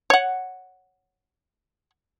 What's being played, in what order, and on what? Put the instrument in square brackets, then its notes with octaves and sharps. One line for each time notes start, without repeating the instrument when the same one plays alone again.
[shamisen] C#5 F#5